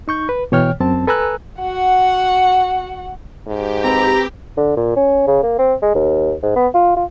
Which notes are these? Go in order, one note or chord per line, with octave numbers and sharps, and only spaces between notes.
D#4 C#6 G6
B4
B2 E3 C#5 G5 F6
F#2 C4 A5
A4 B4 G#5 A#5 E6 F#6
F#4 F#5
G#2 G4
C4 F#4 B4 A#5
D3
A#2
C#4
C#3
A#3
C4
G#3
D#2
G#2
B3
F4
F4